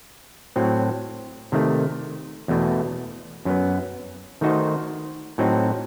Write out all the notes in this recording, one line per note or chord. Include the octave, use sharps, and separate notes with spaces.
A2 F#3 C4
C3 D#3 A3
E2 B2 A3
F#2 F#3 B3
D#3 A3 D#4 F#4 C5
A2 F#3 C4 D#4